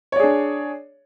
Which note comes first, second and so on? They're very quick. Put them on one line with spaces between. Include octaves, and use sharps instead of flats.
C#5 D5 G#4 D4